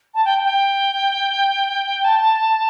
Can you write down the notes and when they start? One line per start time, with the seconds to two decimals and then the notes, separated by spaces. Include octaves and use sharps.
0.14 A5
0.25 G5
0.43 G5
2.04 A5